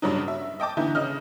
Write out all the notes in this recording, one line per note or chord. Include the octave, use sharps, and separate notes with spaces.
G2 C#3 F#3 D4 D#4
E5
D#5 G5 A5 D6
D3 E3 D#4 E4 G6
C#3 D#5 F6